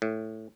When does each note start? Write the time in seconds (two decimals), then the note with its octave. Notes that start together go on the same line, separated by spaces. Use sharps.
0.02 A2